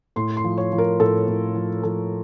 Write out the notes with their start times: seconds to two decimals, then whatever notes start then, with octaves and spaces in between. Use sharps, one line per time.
0.16 A2 C6
0.37 C6
0.44 F3
0.58 C#5
0.72 F3
0.78 A#4
1.00 A2 A4
1.28 A2
1.55 F3
1.83 F3 A4